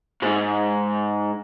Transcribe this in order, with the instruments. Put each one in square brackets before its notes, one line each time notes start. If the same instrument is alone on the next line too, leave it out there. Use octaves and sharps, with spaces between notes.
[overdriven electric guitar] G#2